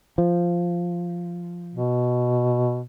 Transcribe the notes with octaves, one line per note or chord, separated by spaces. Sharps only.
F3
B2